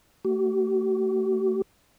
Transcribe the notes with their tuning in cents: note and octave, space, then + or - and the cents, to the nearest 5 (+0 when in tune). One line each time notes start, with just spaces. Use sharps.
A3 +35 F#4 +45